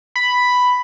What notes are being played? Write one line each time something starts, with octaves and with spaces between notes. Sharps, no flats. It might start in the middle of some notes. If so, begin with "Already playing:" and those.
B5